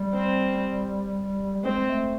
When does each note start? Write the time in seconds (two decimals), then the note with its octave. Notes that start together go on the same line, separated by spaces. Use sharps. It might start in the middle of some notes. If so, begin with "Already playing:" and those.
Already playing: G3
0.14 C4
1.55 G3
1.63 G#3 C4
1.89 A3